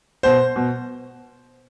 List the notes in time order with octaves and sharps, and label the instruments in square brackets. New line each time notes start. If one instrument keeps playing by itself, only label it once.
[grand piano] B2 C5
B2